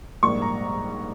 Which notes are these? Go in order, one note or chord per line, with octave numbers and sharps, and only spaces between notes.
A#1 G#2 G3 A#3 C#6
A#5